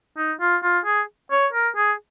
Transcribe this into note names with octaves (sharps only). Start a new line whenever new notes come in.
D#4
F4
F4
G#4
C#5
A#4
G#4